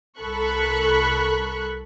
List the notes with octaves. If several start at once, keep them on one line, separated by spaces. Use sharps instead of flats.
C2 A4 A#4 B5 C#6 F#6